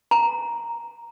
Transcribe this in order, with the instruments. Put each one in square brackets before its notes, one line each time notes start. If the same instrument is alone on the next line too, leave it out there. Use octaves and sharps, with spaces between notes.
[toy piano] A#5